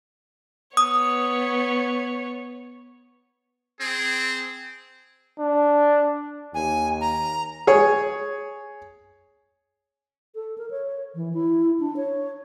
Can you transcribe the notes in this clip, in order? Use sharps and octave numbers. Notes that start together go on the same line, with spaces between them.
B3 C#5 D#6
C4 G#4
D4
D#2 G#5
A#5
G#4 C#5
A4
A#4
C#5
E3
E4
D4
C#5